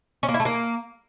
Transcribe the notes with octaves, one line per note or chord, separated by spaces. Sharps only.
C#4
A#3
E4
A3
A#3